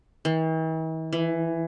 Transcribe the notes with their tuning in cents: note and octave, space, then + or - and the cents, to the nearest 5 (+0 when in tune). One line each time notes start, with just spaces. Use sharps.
E3 -45
E3 +10